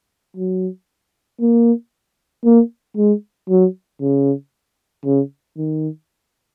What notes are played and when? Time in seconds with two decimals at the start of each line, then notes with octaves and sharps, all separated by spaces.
0.36 F#3
1.41 A#3
2.44 A#3
2.97 G#3
3.49 F#3
4.01 C#3
5.05 C#3
5.57 D#3